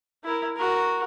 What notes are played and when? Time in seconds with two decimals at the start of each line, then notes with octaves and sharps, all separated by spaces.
0.24 E4 A#4
0.56 F#4 A#4